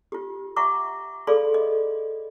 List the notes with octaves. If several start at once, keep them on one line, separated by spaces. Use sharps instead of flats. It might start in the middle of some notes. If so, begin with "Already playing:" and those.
F4 G4
E5 F#5 A#5 C#6 D6
G#4 A4 D5 F5 B5 C6
D#5